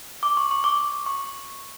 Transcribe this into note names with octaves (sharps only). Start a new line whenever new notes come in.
D6
C#6
C#6
D6
C#6